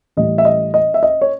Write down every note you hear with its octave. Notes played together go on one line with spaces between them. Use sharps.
A2 E3 G3 D#5
E5
D#5
D#5
E5
D#5
C#5